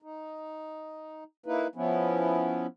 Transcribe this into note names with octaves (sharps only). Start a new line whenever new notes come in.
D#4
A#3 D#4 E4 B4
F3 B3 C#4 E4